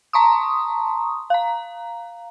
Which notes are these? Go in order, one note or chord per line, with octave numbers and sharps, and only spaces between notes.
A5 A#5 C6 C#6 D#6
F5 A#5